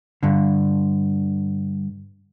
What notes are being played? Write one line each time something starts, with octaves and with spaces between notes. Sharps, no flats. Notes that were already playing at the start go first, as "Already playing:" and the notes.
G2 D3